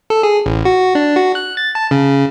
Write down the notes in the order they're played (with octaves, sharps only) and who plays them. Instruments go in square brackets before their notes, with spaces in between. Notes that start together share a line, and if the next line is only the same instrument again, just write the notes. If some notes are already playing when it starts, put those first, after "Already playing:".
[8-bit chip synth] A4
G#4
A1
F#4
D4
F#4
F#6
A6
A5
C#3